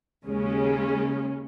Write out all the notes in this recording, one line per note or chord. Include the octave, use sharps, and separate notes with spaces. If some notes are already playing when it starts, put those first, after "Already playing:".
D#2 C#3 G#3 C#4